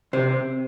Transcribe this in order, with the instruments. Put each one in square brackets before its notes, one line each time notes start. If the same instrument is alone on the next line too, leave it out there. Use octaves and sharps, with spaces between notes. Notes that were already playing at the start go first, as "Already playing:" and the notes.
[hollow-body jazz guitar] C3 C5